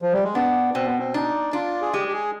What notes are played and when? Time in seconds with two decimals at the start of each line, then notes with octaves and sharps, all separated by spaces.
0.02 F3
0.13 G3
0.24 G#3
0.35 B3 D4
0.74 B2 C4
0.86 B3
0.99 C4
1.14 D4 D#4
1.53 D4 F4
1.82 G#4
1.93 G#3 G4
2.08 G4
2.13 G#4